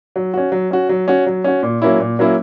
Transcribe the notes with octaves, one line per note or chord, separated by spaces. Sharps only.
F#3
C#4 F#4
F#3
C#4 F#4
F#3
C#4 F#4
F#3
C#4 F#4
A#2
F#3 A#3 C#4 E4
A#2
F#3 A#3 C#4 E4